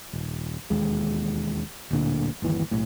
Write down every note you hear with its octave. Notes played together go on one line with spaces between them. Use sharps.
D#1
E1 D#2 G#3
D1 D2 A#2 D3
G1 D#2 E3
B1 A2